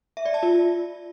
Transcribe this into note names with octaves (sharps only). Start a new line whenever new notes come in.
E5
D5
A5
F4